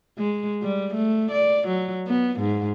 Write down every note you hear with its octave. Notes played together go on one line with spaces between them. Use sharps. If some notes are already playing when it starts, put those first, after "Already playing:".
G#3
G3
A3
D5
F#3
B3
G#2